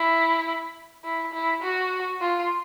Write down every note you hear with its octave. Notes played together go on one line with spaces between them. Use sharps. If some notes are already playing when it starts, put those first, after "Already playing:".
Already playing: E4
E4
E4
F#4
F4